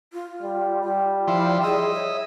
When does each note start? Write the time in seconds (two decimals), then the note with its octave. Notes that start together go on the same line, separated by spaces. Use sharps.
0.13 F4
0.43 G3
0.83 G3 F4
1.28 F3 E4 C6
1.64 G#4 D#5 E5
1.93 C#5